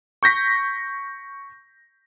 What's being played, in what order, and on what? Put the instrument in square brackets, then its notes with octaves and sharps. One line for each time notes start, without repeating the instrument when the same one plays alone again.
[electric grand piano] C#6 G6 A#6 B6